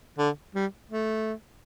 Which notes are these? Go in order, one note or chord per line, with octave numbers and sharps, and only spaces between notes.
D3
G3
A3